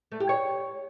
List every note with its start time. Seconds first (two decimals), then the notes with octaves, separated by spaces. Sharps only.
0.12 A3
0.20 G4
0.29 C#5